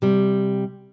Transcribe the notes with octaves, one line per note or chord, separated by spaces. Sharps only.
C3 G3